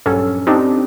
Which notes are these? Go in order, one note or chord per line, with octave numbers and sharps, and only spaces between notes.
A#1 G2 F#3 C#4 A4
C4 D4 D#4 G4